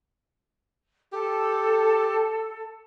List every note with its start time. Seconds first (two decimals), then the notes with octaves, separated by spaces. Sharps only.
1.12 G4 A4